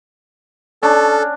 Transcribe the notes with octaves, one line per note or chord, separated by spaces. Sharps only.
C#4 D4 A4